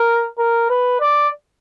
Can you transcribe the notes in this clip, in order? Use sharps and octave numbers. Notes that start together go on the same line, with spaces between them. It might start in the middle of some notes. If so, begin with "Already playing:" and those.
Already playing: A#4
A#4
B4
D5